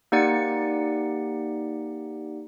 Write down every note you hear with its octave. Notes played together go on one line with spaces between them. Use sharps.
A#3 D#4 G4 D5 F#5 C#7